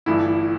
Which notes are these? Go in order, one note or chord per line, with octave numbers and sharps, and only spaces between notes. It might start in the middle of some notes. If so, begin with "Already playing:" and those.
G1 G2 E3 A3 E4